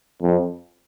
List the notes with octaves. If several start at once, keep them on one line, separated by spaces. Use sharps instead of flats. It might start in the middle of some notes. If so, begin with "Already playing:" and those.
F2